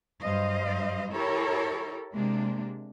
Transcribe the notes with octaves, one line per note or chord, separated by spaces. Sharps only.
G2 F#3 C5 D#5 F5
E4 G4 A4 A#4 C#5
C3 G#3 A#3 D4